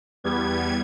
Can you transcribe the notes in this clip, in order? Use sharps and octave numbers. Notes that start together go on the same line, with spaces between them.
E2 G3 B3 G#6